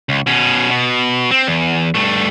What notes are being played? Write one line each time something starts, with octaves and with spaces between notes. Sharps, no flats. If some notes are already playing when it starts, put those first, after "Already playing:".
C#2
B2 C#4
B2
C4
E2
G2 A3